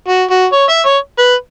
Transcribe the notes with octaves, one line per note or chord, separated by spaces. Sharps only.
F#4
F#4
C#5
E5
C#5
B4